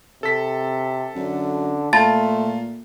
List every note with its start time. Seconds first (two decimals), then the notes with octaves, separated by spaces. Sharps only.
0.23 C3 A4 B6
1.15 F#2 D3
1.93 A#2 A3 F4 A5 B5 A6